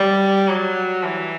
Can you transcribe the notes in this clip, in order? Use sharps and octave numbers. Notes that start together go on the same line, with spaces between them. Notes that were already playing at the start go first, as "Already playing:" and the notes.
Already playing: G3
F#3
E3